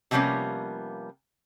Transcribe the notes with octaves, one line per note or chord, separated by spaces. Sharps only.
C3 F3 G3 A#3 B3 C#4